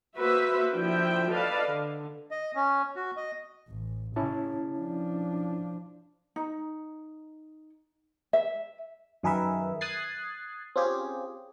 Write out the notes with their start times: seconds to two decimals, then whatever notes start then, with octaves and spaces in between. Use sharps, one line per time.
0.16 A#3 F#4 B4 C5 E5
0.73 D3 F3 E4 E5 G5
1.31 A4 B4 D5 D#5 F5 A5
1.66 D3
2.31 D#5
2.55 C#4
2.96 F#4
3.16 D#5
3.69 A1
4.16 C#3 C#4 E4 A5
4.78 F3 D4
6.36 D#4
8.33 E5
9.23 F#2 D#3 G#4 A#4 B4 E5
9.81 D#6 F#6 G#6 A6 C7
10.76 C4 C#4 F4 G4 G#4